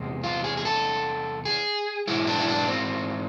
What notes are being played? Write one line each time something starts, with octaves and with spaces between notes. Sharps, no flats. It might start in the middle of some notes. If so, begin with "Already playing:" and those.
Already playing: E2 C3 G#3
F4
G#4
G#4
A4
G#4
G#2 E3 G#3 E4
D4
E4
D4
C4